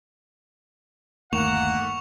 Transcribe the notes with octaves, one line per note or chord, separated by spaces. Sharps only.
G1 D#2 A3 A#3 F#5 C#6 E7 F7